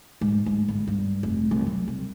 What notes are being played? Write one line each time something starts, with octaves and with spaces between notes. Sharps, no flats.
G#2
G#2
G1
G2
F1
C2
F#3
C2